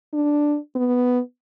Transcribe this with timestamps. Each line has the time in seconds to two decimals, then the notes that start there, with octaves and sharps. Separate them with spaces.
0.13 D4
0.76 B3